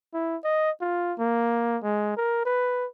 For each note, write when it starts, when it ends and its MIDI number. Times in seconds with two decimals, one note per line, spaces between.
0.14 0.37 64
0.44 0.71 75
0.81 1.13 65
1.19 1.78 58
1.83 2.13 56
2.17 2.45 70
2.46 2.87 71